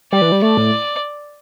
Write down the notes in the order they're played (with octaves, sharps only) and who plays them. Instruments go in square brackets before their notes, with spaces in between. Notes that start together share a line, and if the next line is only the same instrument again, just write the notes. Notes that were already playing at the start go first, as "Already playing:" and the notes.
[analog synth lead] G3 [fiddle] D5
[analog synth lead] E3
G3
[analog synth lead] A3 [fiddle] D5
[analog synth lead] A2